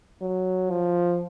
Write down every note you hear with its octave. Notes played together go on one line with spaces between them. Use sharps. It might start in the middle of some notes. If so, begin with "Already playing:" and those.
F#3
F3